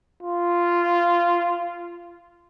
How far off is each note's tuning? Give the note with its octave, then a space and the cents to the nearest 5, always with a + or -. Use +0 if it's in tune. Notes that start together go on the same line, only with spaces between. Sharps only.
F4 -10